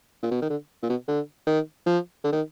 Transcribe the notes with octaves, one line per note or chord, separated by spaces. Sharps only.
A#2
B2
D#3
D3
A#2
B2
D3
D#3
F3
D3
D#3